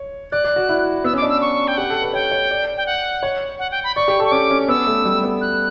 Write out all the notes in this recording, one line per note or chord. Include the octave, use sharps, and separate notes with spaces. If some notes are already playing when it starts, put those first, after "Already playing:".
Already playing: C#5
D5 F#6
D5
F#4
E4
B3 E6
C#4
D6
D4
E6
C#6
G5
G4 F#5
A4
B4
C#5 G5
C#5
D5
G5
F#5
C#5
F#5
G5
B5
D5 C#6
G4
A4 C#6
C#4 D6
C#4
B3 E6
A3
G3
B3
F#6